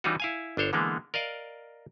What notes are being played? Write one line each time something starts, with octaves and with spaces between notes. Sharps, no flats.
E3 G3 C#4 D#4 F4 F#4
E4 F5 G#5
G1 D4 C5 C#5
D3 E3 G#3 A#3 B3
A#4 D5 D#5 F5